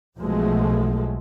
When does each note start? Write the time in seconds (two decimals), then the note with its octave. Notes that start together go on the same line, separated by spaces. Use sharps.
0.19 B1 B2 F3 G#3 A3